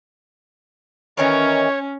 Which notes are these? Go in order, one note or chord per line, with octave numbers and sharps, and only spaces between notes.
D#3 E3 C#4 A#4 C#5